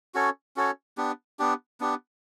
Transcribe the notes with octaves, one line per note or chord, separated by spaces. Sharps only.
C#4 F#4 A4 C#5
C#4 F#4 A4 C#5
B3 D4 G4
B3 D4 G4
B3 D4 G4